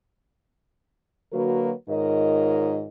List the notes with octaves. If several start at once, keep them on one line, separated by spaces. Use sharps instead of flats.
D3 F#3 A#3 F#4 A#4 B4
G#2 D#3 F4 A#4 C#5 D#5